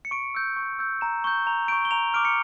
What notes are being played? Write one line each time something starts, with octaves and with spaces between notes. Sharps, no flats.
C#7
C#6 D7
E6 G6
C#6
E6 G6
A#5 E7
C#6 G6 G7
A#5 F7
C#6 G6 D7
G7
A#5 F7
D6 F6 D7
C#7